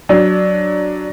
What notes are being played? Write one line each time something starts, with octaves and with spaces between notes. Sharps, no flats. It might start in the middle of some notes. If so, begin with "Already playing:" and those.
F#3 D4